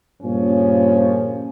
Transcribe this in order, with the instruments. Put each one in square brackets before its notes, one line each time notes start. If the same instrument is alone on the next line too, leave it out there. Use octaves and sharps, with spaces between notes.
[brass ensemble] G2 A#2 C#3 F3 C#4